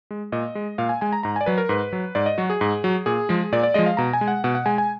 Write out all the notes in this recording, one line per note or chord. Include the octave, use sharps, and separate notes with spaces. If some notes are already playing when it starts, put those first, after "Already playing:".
G#3
A#2 D#5
G#3
A#2 F5
G#5
G#3 G#5
A#5
G#2 A#5
D5 G#5
F#3 B4
A#4
G#2 B4
F#3
G#2 D5
D#5
F#3 F#4
G#4
G#2
F#3
A#2 G#4
F3 G#3
A#2 D5
D5
F3 G#3 D#5
F5
B2 A#5
G#5
G#3
F#5
B2 F#5
F#5
G#3 G#5
G#5